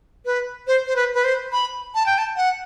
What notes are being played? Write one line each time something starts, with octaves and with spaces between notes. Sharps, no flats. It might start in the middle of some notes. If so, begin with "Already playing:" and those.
B4
C5
C5
B4
B4
C5
B5
A5
G5
A5
F#5